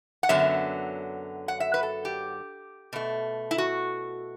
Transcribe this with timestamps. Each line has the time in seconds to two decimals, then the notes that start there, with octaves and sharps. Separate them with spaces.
0.23 F#5
0.29 F#2 D3 F#3 B3 E5
1.48 F#5
1.60 E5
1.74 B4
1.83 A4
2.05 G4
2.93 B2 A3
3.51 E4
3.58 F#4